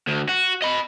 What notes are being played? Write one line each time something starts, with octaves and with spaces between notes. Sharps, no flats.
D2
F#4
D#5 B5